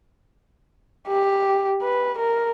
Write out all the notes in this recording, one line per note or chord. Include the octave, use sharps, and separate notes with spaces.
G4
B4
A#4